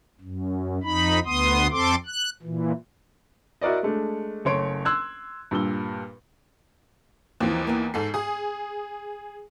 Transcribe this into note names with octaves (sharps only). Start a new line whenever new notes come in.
F#2
F2 D#4 B5
D2 B3 C6 D#6
F2 C4 A4 C6 D6
F#6
A#2 E3
E4 F#4 A#4 D5 D#5
G#3 A3 D4
F#1 A3 C#5 C6 D7
C6 E6 F#6 G#6
G2 A#2 E6 G7
D#2 E3 F3 A#3 C4
A#3 B3 G#5
G#2 A4 G#5 C7
G#4 D#6